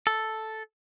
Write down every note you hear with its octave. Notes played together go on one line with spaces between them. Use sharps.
A4